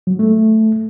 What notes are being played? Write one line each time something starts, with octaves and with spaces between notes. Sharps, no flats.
F#3
A3